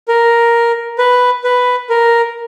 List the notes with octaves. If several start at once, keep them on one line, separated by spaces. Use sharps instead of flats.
A#4
B4
B4
A#4